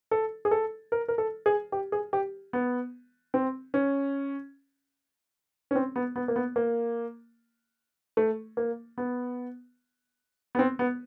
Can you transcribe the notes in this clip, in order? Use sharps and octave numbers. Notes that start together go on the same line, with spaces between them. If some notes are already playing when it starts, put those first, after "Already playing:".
A4
G#4
A4
A#4
A#4
A4
G#4
G4
G#4
G4
B3
C4
C#4
C#4
C4
B3
B3
A#3
B3
A#3
A3
A#3
B3
B3
C4
B3